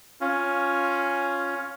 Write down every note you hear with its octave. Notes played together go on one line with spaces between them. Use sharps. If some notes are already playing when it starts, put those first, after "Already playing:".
C#4 F4